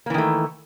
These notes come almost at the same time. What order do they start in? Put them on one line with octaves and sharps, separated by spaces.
A#3 E3 D#3 A3